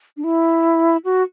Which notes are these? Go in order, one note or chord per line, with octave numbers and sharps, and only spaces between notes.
D4
E4
F#4